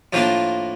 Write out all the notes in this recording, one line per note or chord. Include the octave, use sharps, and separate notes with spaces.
A2 F3 A#3 D4 F4